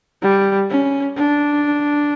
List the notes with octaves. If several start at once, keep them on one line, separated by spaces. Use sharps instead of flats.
G3
C#4
D4